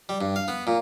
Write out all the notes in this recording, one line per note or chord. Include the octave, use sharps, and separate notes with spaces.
G3
G2
F5
B3
A#2